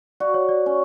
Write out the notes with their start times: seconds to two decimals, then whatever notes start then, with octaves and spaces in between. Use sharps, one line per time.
0.20 F#4 D5
0.34 C#5
0.49 D5
0.66 C#4